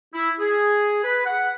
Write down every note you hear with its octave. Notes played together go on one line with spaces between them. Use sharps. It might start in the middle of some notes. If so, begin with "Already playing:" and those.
E4
G#4
B4
F#5